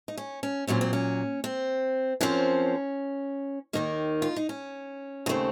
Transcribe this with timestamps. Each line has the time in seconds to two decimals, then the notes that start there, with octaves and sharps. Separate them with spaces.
0.08 D#4
0.17 C#4
0.43 C#4
0.67 A#2 F#3 C4 C#4
0.81 C4
0.93 C#4
1.44 C4
2.21 F#2 F3 C4 C#4
3.73 D#2 D#3 A#3 D#4
4.22 F4
4.36 D#4
4.49 C#4
5.26 D#2 C#3 A3 C4